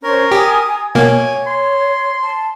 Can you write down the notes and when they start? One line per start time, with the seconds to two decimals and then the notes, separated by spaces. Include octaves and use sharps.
0.04 C#4 A#4 C5 G#6
0.32 G4 G#5 D#6
0.95 B2 A#3 C#5 G#5
1.47 C6
2.22 A5